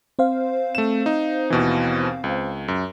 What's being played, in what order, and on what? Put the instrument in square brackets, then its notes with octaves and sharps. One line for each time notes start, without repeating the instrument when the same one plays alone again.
[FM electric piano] C4 C5 F5
[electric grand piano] A3 E7
D#4
D#2 B2 E3
C#2
F#2